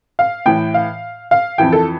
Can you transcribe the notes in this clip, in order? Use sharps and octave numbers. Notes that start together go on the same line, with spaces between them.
F5
A2 E3 G5
F5
F5
F2 E3 G5
A4